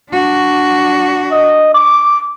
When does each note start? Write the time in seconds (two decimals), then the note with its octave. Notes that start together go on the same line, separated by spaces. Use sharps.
0.10 D4 F#4
1.31 D#5
1.74 D6